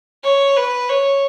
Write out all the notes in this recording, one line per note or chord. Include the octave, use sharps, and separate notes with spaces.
C#5
B4
C#5